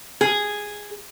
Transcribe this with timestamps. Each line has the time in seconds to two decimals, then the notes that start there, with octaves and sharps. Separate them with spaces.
0.21 G#4